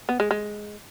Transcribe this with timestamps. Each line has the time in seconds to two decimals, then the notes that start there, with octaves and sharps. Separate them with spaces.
0.09 B3
0.20 G#3
0.31 G#3